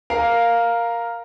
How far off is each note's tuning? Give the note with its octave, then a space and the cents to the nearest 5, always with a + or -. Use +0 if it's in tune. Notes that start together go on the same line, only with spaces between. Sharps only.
A#4 +0 F5 +0